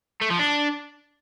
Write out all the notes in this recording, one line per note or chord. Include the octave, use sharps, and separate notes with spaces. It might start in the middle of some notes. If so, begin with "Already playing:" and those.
A3
F3
D4